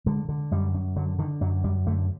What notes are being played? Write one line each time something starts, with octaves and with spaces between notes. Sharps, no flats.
D3 G#3
D3
F#2 G3
F#2
D3 F#3
D3 D#3
F#2 F#3
F#2 G3
D3 A3